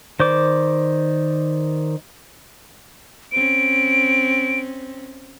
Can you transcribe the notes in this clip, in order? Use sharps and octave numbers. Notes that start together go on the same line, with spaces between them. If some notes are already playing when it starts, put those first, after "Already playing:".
D#3 C5 D5 D6
C4 C#4 D7